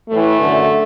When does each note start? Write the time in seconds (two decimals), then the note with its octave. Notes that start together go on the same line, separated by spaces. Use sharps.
0.10 A2 E3 A3
0.40 F#2 D3